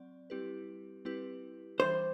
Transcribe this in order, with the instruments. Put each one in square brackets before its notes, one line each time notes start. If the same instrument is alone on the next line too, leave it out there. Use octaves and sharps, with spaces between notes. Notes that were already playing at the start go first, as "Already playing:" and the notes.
Already playing: [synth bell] F#3 C4 D5
G3 C4 E4 G4 B4
G3 C4 E4 G4 B4
[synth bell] E3 G3 D4 [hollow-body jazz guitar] C5